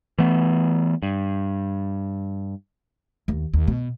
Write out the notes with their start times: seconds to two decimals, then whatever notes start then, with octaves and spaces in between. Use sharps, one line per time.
0.18 E3 A3 B3
1.03 G2
3.28 D#2
3.54 D#2
3.68 B2